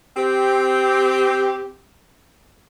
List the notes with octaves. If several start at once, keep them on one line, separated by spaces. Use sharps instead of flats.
C4 G4